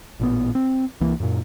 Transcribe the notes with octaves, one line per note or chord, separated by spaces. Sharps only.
A1 A#2 B3
C4
C2 E3 A#3
F#2 A#2